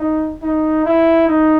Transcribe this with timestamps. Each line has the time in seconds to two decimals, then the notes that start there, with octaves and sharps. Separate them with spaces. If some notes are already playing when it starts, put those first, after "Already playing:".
Already playing: D#4
0.42 D#4
0.85 E4
1.28 D#4